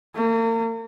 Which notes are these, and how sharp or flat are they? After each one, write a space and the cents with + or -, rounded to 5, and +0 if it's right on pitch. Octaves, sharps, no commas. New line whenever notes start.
A#3 -40